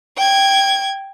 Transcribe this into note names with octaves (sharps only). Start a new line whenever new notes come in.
G5 G#6